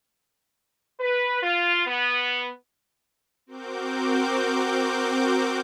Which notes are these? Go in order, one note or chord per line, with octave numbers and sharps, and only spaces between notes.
B4
F4
B3
C4 F#4 A#4 D6 G6